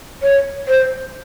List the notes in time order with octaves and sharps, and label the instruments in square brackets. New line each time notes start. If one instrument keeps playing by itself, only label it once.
[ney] C#5
C5